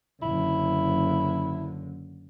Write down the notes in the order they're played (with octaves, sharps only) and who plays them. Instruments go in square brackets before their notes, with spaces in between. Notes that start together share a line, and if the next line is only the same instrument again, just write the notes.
[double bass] F#1 D3 [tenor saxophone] E4